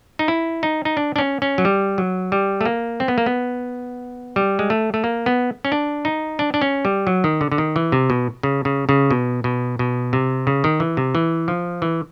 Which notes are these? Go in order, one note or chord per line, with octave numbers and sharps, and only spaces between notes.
D#4
E4
D#4
D#4
D4
D4
C#4
C#4
F#3
G3
F#3
G3
A3
A#3
C4
B3
A#3
B3
G3
G#3
A3
A3
A#3
B3
C#4
D4
D#4
D4
D4
C#4
G3
F#3
D#3
D3
D3
D#3
E3
C3
B2
C#3
C#3
C#3
B2
B2
B2
C3
C#3
D#3
E3
C3
E3
F3
E3